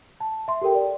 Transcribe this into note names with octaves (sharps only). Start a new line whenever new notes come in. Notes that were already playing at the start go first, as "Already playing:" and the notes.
A5
E5 C6
G4 A4 A#4 G5
D5